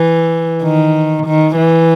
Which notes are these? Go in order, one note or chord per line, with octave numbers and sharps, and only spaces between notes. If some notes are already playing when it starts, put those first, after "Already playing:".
Already playing: E3
D#3
D#3
E3